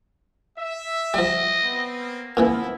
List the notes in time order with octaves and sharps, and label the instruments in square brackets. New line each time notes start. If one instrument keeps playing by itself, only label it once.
[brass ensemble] E5
[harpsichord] F3 G3 [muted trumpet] D#5
[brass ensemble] B3 C4
[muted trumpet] A#3
[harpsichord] A#2 C#3 E3 [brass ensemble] F3 B3 E4